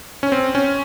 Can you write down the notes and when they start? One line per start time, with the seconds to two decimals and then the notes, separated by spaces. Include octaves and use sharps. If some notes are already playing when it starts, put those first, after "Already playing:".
0.23 C#4
0.32 C4
0.55 C#4